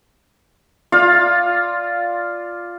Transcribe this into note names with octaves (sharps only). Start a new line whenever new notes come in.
F4 D5 F5